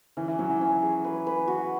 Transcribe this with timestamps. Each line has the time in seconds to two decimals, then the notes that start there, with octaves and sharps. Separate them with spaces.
0.17 E3 C#4
0.28 E3
0.39 F#3 C#4
0.50 E3
0.61 C#4
0.83 G#4
1.04 B4
1.27 B4
1.48 F#4